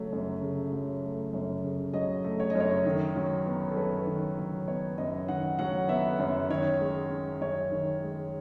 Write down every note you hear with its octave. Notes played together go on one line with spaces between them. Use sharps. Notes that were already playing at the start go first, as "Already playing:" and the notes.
Already playing: C#3 F#3 A3
F#2
C#3
F#3
A3
F#2
C#3
F#3 D#5
A3
C#5
D#5
F#2
C#5
D#3
F#3
B3
A4
F#2 B4
D#3
F#3
B3 C#5
F#2 D#5
D#3 F#5
F#3 F#5
B3 E5
F#2
D#3 C#5
G#3
C#4
F#2 C#5
D#3
G#3